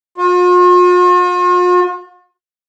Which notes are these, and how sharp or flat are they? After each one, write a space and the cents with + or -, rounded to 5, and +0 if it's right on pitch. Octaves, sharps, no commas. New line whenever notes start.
F4 +45